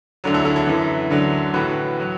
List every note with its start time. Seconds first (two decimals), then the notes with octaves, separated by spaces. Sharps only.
0.24 D2 D3 F#3
0.34 E4 A4
0.45 E4 A4
0.56 E4 A4
0.67 F#2 E3
1.11 D2 D3 F#3
1.54 A2 E3 F#4 B4
2.00 F#3